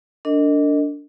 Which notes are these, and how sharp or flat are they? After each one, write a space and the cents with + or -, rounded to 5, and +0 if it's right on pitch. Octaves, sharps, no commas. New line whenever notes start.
D4 -15 A#4 -40 D#5 +0